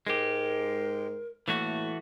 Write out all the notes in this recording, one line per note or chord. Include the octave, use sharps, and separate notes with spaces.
G#2 G#3 G4 A#4
A2 E3 A3 A#3 F#4